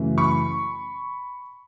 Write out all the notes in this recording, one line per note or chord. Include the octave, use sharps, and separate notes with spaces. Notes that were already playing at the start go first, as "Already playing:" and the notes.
Already playing: F#2 C#3 E3 A3
B5 C#6